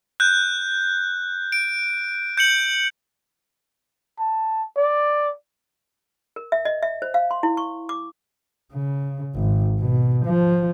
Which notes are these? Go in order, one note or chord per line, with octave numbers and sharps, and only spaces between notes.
F#6 G6
D7
G6 C#7 F#7
A5
D5
A#4
E5
D#5
E5
C5
F5
C6
E4
C#6
D6
C#3
G#1
B2
F3